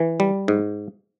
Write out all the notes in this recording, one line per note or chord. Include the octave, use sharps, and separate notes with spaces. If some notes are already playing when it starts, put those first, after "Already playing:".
Already playing: E3
G3
G#2